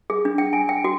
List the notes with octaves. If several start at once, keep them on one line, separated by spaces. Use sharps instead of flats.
G#4
D4
G5
G#5
G5
F#4